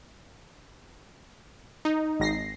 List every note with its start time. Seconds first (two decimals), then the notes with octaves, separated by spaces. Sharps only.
1.85 D#4
2.20 G#1 A#6 C7